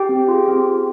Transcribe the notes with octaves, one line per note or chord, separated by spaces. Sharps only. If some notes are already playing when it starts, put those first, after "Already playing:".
Already playing: G4 G5
C4
F4 G#4
C4
F4 G#4